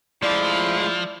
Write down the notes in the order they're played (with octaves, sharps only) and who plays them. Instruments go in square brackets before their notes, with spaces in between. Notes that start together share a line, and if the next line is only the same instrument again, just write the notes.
[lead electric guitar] F3 [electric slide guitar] G#3 A3 F4 [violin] E4 [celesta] D5 D6